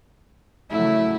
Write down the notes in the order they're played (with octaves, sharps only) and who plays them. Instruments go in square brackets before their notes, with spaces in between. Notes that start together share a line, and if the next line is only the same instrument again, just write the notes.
[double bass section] C#3 F#3 A3 [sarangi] E4